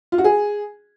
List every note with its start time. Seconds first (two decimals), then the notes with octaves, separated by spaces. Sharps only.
0.12 F4
0.18 F#4
0.24 G#4